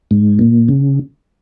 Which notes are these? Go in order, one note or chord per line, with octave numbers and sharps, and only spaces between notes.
G#2
A#2
C#3